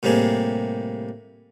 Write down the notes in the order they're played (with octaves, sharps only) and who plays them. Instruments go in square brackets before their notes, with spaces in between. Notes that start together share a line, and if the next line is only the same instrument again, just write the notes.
[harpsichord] A2 C3 G3 A#3 G#4